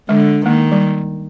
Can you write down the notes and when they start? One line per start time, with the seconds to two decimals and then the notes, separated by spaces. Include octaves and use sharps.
0.09 D3 G#3
0.46 D#3 A#3
0.72 G3